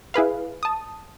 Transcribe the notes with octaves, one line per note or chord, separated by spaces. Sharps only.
E4 G#4 B4 F5
A5 D#6